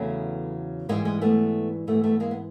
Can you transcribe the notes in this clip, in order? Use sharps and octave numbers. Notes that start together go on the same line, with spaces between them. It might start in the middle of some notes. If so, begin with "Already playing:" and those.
Already playing: E2 C#3 F#3 A3 B3
G#2 E3 G3 G#3 A#3
G#3
A3 B3
G#2 E3 G3 A3 B3
A3 B3
G#3 A#3
B3